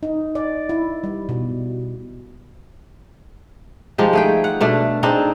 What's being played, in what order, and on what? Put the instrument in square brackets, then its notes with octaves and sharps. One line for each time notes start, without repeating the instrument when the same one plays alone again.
[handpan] D#4
D5
E4
G3
B2
[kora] F3 G#3 D#4 G4
A3 G#4 G5
F#5
B2 A3 D4
C4 D4 D#4 G#4